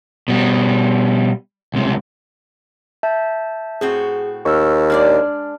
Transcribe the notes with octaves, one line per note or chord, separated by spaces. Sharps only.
B2 G3
C#2 C3
E5 A5 G6
A2 C4 F#4 G#4
D#2 C#6 E6 F6
G#3 D4 D5 F6